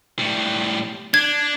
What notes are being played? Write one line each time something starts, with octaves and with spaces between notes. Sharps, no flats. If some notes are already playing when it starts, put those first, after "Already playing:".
A2 G3
D4 G#6